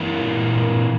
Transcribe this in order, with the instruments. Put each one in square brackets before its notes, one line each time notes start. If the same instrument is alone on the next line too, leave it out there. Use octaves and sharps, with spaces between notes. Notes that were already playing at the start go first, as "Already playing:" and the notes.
Already playing: [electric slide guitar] E3 A#3 E4
[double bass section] A#2
A#2